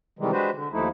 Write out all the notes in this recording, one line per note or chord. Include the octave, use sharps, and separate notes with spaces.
C3 D#3 E3 G3 G#3
G#3 D4 F#4 G4 B4 C5
D3
D#2 F3 A3 D#4 E4